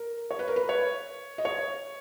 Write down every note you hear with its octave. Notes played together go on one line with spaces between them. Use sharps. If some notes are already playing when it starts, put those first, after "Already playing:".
Already playing: A#4
C#5
B4
A#4
B4
C#5
D#5
C#5